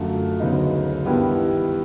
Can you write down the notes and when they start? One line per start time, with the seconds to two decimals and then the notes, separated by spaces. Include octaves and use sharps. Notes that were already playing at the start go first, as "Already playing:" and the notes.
Already playing: F#2 D3 F3 A3
0.40 D2 C#3 F#3 B3 D#4
1.05 G2 D#3 G3 B3 E4